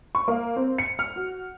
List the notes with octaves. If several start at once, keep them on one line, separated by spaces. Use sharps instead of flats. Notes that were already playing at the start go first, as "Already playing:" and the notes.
C#6
A#3
C4
C#7
F6
F#4